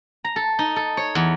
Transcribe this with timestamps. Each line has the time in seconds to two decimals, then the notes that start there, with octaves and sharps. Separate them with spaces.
0.24 A#5
0.36 A4
0.59 D#4
0.76 A4
0.97 C#5
1.15 E2